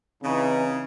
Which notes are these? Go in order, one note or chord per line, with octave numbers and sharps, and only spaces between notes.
C#3 E3 C4 D#4